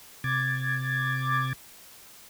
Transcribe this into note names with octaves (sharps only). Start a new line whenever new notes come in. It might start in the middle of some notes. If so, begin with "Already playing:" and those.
C3 D6 G#6 A6